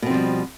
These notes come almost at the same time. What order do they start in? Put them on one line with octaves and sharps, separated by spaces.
B2 C4 F3 G3